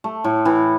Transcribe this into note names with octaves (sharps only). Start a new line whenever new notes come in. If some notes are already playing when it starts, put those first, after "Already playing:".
A3
A2
E3